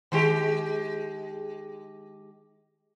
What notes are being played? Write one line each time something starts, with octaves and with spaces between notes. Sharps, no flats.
D#3 G#3 G4